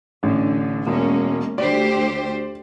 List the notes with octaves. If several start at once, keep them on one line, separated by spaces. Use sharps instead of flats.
A1 D3
E1 G#3 A#3 C#4
D2 G4 C5 D5